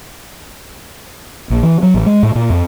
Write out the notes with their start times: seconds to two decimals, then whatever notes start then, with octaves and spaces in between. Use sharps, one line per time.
1.50 A#1
1.63 E3
1.83 F#3
1.94 A1
2.06 G#3
2.23 A2
2.35 A#2
2.50 F2